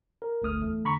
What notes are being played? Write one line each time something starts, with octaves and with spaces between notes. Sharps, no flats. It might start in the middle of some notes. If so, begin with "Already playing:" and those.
A#4
G1 D2 A3 D#6 F6
E2 A3
D3 A#5 B5 C#6